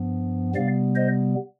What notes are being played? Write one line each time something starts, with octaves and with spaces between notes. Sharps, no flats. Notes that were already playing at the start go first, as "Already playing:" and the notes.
Already playing: G2 F3 B3
C3 G3 B3 D5 F5
C5 D#5